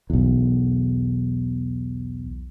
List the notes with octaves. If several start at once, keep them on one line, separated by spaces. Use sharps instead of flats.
B1 E2